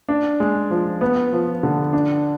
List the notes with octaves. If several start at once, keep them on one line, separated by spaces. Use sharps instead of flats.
D4
G#3
F3
B3
F3
D3
D4